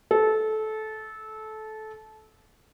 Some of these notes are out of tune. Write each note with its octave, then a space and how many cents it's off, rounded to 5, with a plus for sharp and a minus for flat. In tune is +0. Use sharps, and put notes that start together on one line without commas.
A4 -20